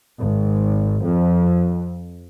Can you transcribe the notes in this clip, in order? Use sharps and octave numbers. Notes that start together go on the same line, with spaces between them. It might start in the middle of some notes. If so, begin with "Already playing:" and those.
G#1
F2